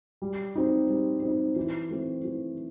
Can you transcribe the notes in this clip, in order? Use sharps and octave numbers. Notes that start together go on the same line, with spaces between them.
G3
C4 D#4
G3
C4 D#4
E3
A3 C4
E3